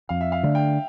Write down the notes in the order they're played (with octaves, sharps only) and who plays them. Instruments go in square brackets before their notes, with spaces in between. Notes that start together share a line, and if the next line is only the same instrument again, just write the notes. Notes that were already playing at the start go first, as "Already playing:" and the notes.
[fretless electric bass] F2 [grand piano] F5
[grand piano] E5
F5
[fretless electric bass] D3 A3 D4
[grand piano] G5